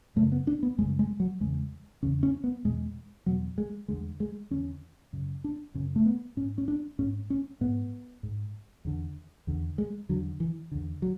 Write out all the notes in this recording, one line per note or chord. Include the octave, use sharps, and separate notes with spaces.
F#2 C#3 A3
B3
D4
B3
F#2 C#3 G#3
G#3
F#3
E2 C#3 G#3
E2 C#3 C#4
C#4
B3
E2 B2 G#3
E2 B2 F#3
G#3
E2 D3 G#3
G#3
E2 D3 C#4
F#2 C#3
D4
F#2 C#3 C#4
A3
B3
G#2 C#4
C#4
D4
G#2 C#4
C#4
G#2 B3
G#2
E2 D3
E2 D3
G#3
E2 D3 F#3
E3
E2 D3
F#3